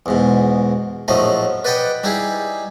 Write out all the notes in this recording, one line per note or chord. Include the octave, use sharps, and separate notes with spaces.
E2 G#2 B2
A#1 A2 F3 F#3 A3 D#5
B4 D5 D#5 F#5 G5 B5
G3 D#4 E4 G4 G#4